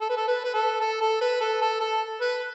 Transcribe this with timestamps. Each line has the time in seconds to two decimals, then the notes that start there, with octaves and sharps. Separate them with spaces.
0.01 A4
0.09 B4
0.17 A4
0.27 B4
0.44 B4
0.54 A4
0.80 A4
1.01 A4
1.21 B4
1.40 A4
1.61 A4
1.80 A4
2.21 B4